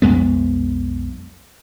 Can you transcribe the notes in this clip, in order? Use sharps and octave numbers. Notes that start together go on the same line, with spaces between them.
B1 F2 G#3 B3